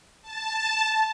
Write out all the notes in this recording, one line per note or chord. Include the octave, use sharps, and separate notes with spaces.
A5